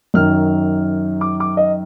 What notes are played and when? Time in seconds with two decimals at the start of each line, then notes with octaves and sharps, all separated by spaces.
0.14 F#2 D#3 F6
1.21 D6
1.40 D6
1.57 D#5